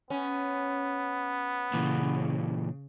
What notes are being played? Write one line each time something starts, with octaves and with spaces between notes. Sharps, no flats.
B3 C#4
A#2 C#3 E3